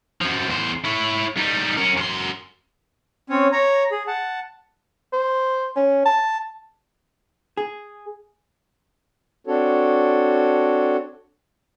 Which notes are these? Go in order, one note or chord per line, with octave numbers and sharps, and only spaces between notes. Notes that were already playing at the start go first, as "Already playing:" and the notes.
F#2 F3
E2 C5
E4 C#5
G3 D#4
C#4 A#4
F#2 C6
C4 C#4 C#5
C#5 A#5
G#4
F#5 A5
C5
C#4
A5
G#4
C4 D4 F#4 A4 C#5